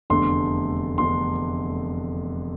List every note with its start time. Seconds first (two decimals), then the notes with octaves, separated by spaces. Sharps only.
0.10 F1 E2 D3 A3 D4 C6
0.98 F1 E2 D3 A3 D4 C6